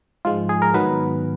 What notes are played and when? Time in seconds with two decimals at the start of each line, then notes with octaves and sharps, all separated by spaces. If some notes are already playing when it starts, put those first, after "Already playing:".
0.25 G#2 F3 G#3 F4
0.49 G#4
0.62 A#4
0.74 G#2 D#3 F#3 B3 B4